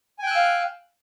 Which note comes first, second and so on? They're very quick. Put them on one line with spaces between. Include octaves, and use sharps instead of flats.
G#5 G5 F#6 E6 F5